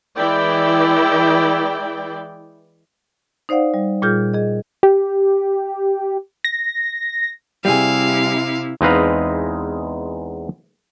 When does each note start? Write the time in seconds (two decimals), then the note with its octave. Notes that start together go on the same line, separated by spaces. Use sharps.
0.16 E3 G#3 E4 D5 G5
3.49 D#4 C5 D5 F5 F#5
3.74 G3
4.02 A#2 G3 F4 G#4 F6 G6
4.34 G#4 D#5
4.83 G4
6.44 A#6
7.65 C3 G3 E4 G#4 F5
8.81 E2 G#3 C4 D#4 B4 F5